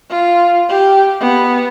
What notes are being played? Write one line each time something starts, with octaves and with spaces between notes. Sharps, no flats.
F4
G4
B3